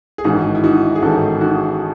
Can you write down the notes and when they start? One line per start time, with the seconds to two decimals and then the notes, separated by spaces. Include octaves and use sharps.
0.18 G#4
0.24 A1 G#2 D#3 D#4 F#4
0.55 E4
0.64 D#4 F#4
0.95 G#4
1.02 A1 G#2 D#3 F#4 A4
1.41 D#4 F#4